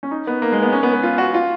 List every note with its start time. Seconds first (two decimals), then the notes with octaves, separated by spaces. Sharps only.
0.03 C#4
0.11 D#4
0.27 B3
0.42 A#3
0.52 G#3
0.62 B3
0.72 C#4
0.83 B3
0.93 B3
1.03 F4
1.18 F#4
1.34 F4